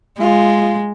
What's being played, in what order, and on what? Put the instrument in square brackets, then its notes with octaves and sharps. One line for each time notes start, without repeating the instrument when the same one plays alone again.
[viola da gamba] G#3 [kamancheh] F4